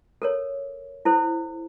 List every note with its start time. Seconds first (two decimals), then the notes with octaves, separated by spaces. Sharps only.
0.22 A4 A#4 C#5
1.05 E4 A4 C5